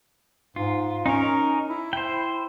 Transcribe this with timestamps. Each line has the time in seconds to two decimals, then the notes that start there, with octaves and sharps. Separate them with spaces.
0.56 G#2 F4
1.06 C#4 D#4 A#4
1.69 E4
1.93 C5 G5